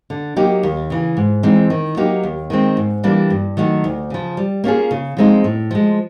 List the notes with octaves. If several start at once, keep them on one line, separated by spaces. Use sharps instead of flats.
D3
F#3 A#3 D#4 G4
D#2
C#3 E3
G#2
E3 G#3 C4 D#4
D#3
F#3 A#3 D#4 G4
D#2
D#3 G#3 C4
G#2
E3 G3 A#3 D4
G2
D#3 F#3 A3
D2
C#3 F3
G3
A#3 C#4 F4 G#4
C#3
F3 G#3 C4 D#4
A2
F3 G#3